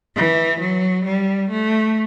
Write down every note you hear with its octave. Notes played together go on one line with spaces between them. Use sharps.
E3
F#3
G3
A3